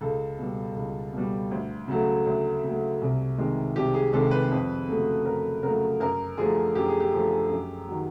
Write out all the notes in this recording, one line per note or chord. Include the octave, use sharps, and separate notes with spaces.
C#2 A4
B2 G3
C#2
B2 G3
D2
C#3 F#3 A3
D2
C#3 F#3 A3
C2
C3 D#3 G#3
C2 G4
G#4
C3 D#3 G#3 A4
B4
F2
C#3 F#3 A3
F2 A#4
C#3 F#3 A3 A#4
F#2 A#4
D3 F3 A3 G#4
F#2 G4
G#4
G4
D3 F3 A3
F#2
D#3 F#3